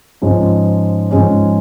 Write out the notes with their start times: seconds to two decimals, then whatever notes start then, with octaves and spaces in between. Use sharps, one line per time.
0.22 G#2 F3 G#3 C#4
1.11 G#2 F3 G#3 C#4